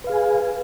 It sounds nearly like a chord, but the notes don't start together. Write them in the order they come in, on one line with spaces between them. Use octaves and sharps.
B4 F5 G#4 G#5